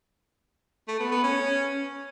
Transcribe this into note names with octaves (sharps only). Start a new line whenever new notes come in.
A3
B3
B3
C#4